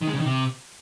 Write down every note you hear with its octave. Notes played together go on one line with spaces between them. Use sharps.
D#3
G#3
C#3
D#3
C3